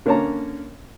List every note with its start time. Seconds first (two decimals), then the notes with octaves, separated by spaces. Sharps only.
0.06 D3 A#3 C#4 C#5 A5 A#5